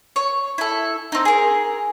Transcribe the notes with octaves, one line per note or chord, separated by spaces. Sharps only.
C#5
E4 A4
C4 D#4
G#4 A#4